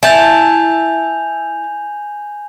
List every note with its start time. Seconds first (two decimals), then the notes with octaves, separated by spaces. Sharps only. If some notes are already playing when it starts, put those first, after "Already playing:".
0.03 E4 G#5 A5 G6 F7